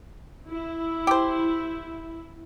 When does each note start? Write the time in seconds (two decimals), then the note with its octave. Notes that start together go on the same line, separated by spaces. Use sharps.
0.50 E4
1.07 G4 C5